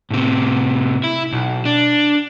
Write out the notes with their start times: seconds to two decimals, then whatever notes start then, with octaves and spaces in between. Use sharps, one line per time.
0.11 A2 C3
1.04 E4
1.32 B1
1.65 D4